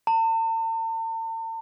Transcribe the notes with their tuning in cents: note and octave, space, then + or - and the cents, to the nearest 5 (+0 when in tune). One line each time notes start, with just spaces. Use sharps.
A5 +45